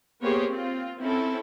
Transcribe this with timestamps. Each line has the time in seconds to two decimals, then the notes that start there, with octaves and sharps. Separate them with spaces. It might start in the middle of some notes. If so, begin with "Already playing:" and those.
0.23 A#3 B3 G4 G#4 C5 C#5
0.51 C4 F4
1.00 C4 C#4 E4 A4